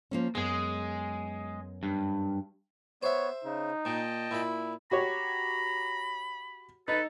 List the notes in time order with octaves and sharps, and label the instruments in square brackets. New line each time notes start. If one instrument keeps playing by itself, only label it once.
[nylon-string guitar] F3 A#3 C#4
[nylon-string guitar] F#2 B3 [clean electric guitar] G#3 G#4
[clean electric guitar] G2
[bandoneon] B3 [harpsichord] C5 E5 [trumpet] C#5
[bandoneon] C#3 [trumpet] D#4
[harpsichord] A#2 [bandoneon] D#5 G5 A5
[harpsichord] A#2 B5 [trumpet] E4
[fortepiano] F#4 G4 C#5 [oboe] A#5 [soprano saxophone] B5
[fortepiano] D#4 [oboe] A4 [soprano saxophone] B4